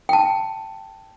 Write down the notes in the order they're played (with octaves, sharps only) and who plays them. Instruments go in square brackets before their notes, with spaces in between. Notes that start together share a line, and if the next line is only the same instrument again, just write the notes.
[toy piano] G5 A5